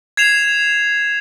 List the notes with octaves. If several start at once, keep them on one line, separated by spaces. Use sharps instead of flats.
G#6 C7 E7 F7